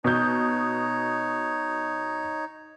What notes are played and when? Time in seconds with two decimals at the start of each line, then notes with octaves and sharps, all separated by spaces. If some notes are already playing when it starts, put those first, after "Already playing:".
0.04 B2 D#4 C#5 G6